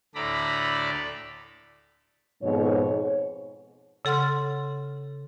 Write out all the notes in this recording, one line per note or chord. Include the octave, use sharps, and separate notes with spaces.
D2 A2 A4 D5 A#5 B5
F2 G#2 B2 C#5
C#3 A4 F#5 C6 F6